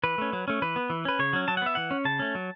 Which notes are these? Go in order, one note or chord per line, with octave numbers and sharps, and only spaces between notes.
E3 B4
A3 C#4
F#3
A3 C#4
E3 B4
B3
E3
C#4 B4
C#3 C#5
F#3 C#4
F#3 A5
F#5
B3 E5
E3 F#5
C#4
C#3 A5
A3 C#4
F#3